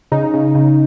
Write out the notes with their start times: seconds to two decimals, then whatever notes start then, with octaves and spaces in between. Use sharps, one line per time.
0.12 C#3 D#4
0.34 C#3
0.55 C#3